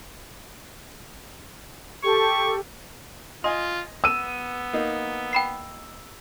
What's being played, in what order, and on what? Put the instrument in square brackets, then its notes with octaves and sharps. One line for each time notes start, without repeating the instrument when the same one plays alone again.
[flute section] G4 A4 [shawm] C#6
[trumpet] F4 [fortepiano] D#5 G#5 [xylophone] C6
[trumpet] B3 [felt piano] E6 D#7
[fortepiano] A#3 D#4
[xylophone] G5 B5 C7